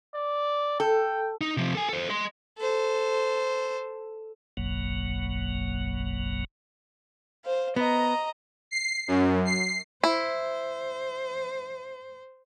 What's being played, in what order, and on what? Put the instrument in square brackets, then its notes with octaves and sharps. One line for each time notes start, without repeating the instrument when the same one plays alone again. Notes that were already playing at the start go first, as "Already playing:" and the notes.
[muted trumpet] D5
[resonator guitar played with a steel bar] A4 [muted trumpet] G5
[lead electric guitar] D#4
C3 F3
A4 G#5
A4 C5
D#5 C6
[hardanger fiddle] A4 C5
[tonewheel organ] F#1 B1 F#2 B2 F#3 A#3
[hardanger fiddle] C5 F5
[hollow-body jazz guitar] B3 [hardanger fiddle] D#5 A#5
[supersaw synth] C7
F#2
C7
[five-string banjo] E4 [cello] C5